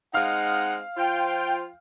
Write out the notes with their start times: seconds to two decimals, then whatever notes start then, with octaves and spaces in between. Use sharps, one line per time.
0.14 G#3 C4 D#4 F5 F#5 F6
0.97 F3 F4 C5 G5